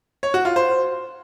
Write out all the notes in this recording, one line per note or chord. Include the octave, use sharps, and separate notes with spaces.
C#5
F#4
F4
C5